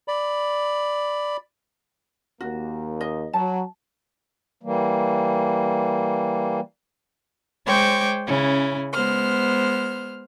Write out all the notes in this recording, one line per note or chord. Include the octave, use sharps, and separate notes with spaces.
D5 B5
D#2 A#3 F#4
D#5
F#3 A5
E3 G3 A#3
G#3 C5 C#5 G5 C#6 D6
C#3 C#4 E4
G#3 B3 C5 F6